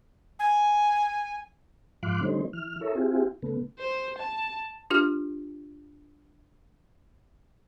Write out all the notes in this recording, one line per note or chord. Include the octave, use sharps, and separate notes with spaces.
G#5
G#2 F3 F5 C6 D6 F#6
D3 G3 A3 C#4 D#4 C5
E3 F6
E4 A4 A#4 C#5 E5
C4 E4 F4 G4 G#4
C#3 A3 B3
C5
A5
D4 F4 G4 F6